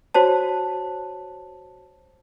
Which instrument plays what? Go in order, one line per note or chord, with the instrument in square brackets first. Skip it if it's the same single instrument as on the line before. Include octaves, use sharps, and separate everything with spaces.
[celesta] F#4 C5 C#5 A5